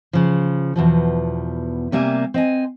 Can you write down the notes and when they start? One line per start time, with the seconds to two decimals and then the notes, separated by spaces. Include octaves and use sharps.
0.13 C#3 F3
0.76 E2 B2 F3
1.92 C3 G3 A#3 E5 G#5
2.34 C4 D#5 G#5